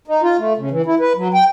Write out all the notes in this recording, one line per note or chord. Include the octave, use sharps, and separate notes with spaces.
D#4
F4
A3
C#3
E3
E4
B4
F#3
G5